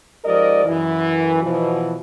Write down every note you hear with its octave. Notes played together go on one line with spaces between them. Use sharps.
G#2 F3 G4 A#4 D5 D#5
F#2 E3
B2 E3 F3